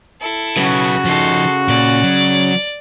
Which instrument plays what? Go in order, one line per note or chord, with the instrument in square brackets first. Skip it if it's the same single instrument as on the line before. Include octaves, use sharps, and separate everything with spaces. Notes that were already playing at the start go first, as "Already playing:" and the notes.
[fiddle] E4 A4
[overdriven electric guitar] C#3 [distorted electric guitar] F#3 B4 [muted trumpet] F#4
[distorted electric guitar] F3 D#4 [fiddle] A4 C6
[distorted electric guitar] A#2 [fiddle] D5
[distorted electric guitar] F#3